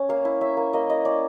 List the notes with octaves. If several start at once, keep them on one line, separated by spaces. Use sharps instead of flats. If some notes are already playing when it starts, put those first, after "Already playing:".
Already playing: C#4
A#3 F5
E4
C#4 E5
A#3
A#3 D#5
E4 D#5
C#4 D5